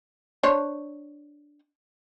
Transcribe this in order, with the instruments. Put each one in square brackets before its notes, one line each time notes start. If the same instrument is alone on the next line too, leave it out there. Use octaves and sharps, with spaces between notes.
[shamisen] D4 C5 C#5